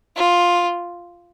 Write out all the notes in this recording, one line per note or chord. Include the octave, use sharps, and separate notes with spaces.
F4